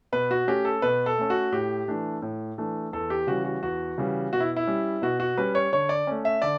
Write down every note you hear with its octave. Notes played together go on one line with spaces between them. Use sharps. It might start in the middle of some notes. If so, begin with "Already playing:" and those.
B2 B4
F#4
A3 C#4 G4
A4
B2 B4
A4
A3 C#4
F#4
A2 G4
E3 A3 D4
A2
E3 A3 D4
E2 A4
G4
C#3 E3 G3 F#4
F#4
E2 F#4
C#3 E3 G3
B2 F#4
E4
E4
G3 C#4
B2 F#4
F#4
G3 C#4 B4
C#5
D3 C#5
D5
A3 C#4
E5
D3 D5